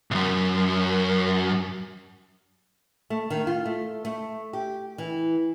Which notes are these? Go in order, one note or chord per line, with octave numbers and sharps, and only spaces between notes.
C2 F#2
A3
D#3
F4
A3
A3
G4
E3